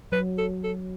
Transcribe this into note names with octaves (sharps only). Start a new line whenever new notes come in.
F#3 B4
A4
A4